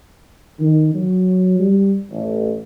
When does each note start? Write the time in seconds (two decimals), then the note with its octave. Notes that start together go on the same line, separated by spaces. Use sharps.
0.59 D#3
0.94 F#3
1.59 G3
2.10 A1